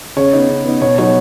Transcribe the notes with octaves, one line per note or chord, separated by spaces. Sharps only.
C#3 C#5
B3 D#4
C#3
B3 D#4
B2 C#5
F#3 B3 D#4 C#5